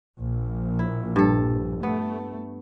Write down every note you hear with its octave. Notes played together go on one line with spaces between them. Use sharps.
A#1
E4
G2 A4
A3 B3